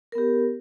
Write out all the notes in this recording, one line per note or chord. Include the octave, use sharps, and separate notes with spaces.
B3 G4 A#4